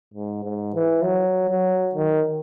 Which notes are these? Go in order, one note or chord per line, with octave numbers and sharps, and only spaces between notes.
G#2
G#2
E3
F#3
F#3
D#3